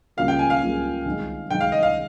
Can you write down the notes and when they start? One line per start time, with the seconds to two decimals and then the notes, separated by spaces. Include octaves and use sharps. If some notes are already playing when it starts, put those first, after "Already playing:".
0.17 C#2 C#3 G3 A#3 F4 F5
0.28 G5
0.39 G#5
0.50 F5
0.61 C#2 C#3 G3 A#3 F4
1.05 C2 C3 D#3 G#3
1.49 C2 C3 D#3 G#3 G5
1.61 F5
1.72 D#5
1.83 F5